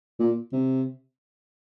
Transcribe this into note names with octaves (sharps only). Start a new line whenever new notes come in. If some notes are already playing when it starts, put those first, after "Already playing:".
A#2
C3